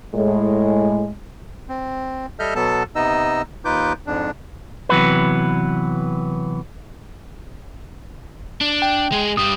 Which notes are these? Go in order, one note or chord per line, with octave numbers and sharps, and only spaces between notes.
A2 G#3
C4
G3 A4 D#5 E5 F6 G6
B2 F#3 B3 A4 A5
C3 B3 D#4 D#5 E6
D#2 D#4 F4 B4 D6 G6
F2 G#2 D4
C3 E3 F#3 B3 B4
D4
G5
G#3 G#4
G2 G3 D#6